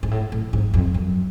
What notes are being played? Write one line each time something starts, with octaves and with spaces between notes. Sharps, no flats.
G#2
A2
A2
G#2
F2
F#2